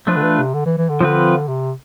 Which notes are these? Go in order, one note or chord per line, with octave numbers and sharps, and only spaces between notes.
F3 A3 D4 F4 B4
D3
E3
C3
D3
E3
E3
D3
D3 F3 C4 F4 B4
C3